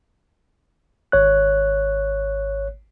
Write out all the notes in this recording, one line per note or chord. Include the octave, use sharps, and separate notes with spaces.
G#1 C#5 F#6